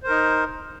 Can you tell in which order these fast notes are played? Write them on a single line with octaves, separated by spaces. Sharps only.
C5 A#4 D#4